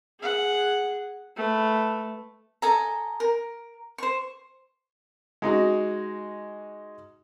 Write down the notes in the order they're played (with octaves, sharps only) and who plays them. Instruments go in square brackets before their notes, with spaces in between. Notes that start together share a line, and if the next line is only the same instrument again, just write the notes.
[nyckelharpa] G#4 F#5
A3 B4
[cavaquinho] A4 D#5 G#5 A#5
A#4
C5 C#6
[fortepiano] G#3 D#4 F#4